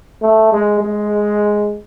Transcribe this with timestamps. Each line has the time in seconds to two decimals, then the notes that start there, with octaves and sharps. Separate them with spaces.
0.22 A3
0.52 G#3
0.81 G#3